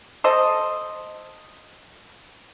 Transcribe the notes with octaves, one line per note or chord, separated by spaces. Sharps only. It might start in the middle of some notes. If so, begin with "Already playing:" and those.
A4 C5 D#5